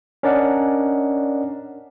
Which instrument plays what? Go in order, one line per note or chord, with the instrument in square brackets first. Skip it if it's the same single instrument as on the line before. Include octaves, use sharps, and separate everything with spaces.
[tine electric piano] C#4 D4 A#4 D5 D#5 F#5